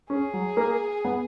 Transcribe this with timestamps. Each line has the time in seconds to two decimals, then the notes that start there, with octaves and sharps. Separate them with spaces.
0.10 C#4 G#4
0.33 F#3
0.57 A#3
1.05 B3